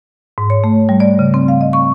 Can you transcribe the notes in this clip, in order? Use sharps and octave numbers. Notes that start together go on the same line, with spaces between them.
G#2
C#5
A3
G3
D5
C#3
C4
F5
D#5
C#6